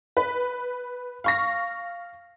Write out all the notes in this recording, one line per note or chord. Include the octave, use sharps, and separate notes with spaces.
B4
F5 C#6 A#6